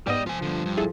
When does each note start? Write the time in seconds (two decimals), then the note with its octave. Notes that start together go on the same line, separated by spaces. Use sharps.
0.07 G#2 G3 B3 G4 D5 D#5
0.27 F3 F4 G#5
0.42 G2 D3
0.66 G2
0.77 E4 G#4 A4